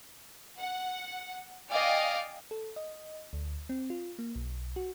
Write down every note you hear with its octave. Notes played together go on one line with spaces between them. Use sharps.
F#5
D5 D#5 F5 G5 G#5 D6
A4
D#5
D2
C4
F4
A#3
B1
F#4